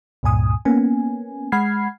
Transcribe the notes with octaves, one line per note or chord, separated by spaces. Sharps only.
C#2 G2 A#2 G#5 D#6
A#3 B3 C#4 G#5
G#3 F#5 B5 F6 G#6 C7